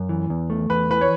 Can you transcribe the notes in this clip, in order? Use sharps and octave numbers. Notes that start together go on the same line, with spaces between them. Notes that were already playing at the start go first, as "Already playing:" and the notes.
Already playing: F#2
E3
E2
A3
E2 B4
E3 B4
C#5